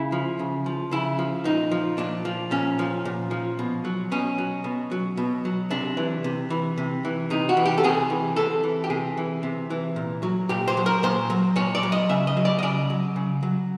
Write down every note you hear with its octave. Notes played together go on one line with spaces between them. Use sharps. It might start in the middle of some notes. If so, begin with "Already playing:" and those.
Already playing: C#3 E4
F3
C#3
F3
C#3 E4
F3
A#2 D#4
F3
A#2 D4
F3
A#2 C#4
F3
A#2
F3
B2
F#3
B2 C#4
F#3
B2
F#3
B2
F#3
C3 D4
E3
C3
E3
C3
E3
C3 D#4
F#4
E3
G4
A4
C3 G#4
E3
C3 A4
E3
G4
C3 G#4
E3
C3
E3
A#2
F#3
A#2 G4
C5
F#3
A#4
A#2 C5
F#3
A#2 C#5
D5
F#3
D#5
C#3 E5
D#5
F#3
D5
D#5
C#3 D5
F#3
C#3
F#3